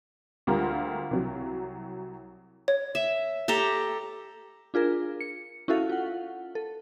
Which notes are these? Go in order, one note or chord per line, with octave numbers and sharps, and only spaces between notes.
D2 G3 F4 A#4 A#5
C2 F#3
C#5
E5
G4 A4 A#5
D4 F4 G#4 A#4
C#7
C#4 E4 F#4 A4 F5
F4 F#5
A4